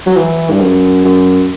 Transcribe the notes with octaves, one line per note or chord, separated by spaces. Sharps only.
F#3
E3
G2
F#2
F#2